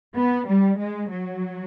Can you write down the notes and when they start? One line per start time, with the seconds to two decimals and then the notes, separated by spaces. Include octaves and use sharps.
0.15 B3
0.47 G3
0.78 G#3
1.10 F#3